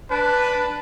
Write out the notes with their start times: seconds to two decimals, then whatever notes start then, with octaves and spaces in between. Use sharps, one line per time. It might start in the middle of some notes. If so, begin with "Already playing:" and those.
0.11 D4 B4